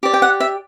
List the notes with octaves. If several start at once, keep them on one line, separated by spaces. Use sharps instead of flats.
G4 D5
G5
F#5
E5